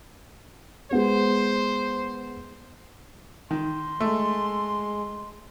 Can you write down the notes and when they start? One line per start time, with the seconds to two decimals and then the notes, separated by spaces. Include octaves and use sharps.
0.91 G#3 B3 G#4 C5
3.51 D#3 C6
4.00 G#3 A3